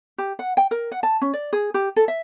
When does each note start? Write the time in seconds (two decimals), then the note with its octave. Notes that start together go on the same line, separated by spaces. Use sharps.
0.18 G4
0.39 F#5
0.57 G5
0.71 A#4
0.92 F#5
1.03 A5
1.21 C#4
1.33 D5
1.53 G#4
1.74 G4
1.96 A4
2.08 E5